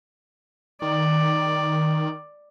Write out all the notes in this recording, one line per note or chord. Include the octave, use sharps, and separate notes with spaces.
D#3 D5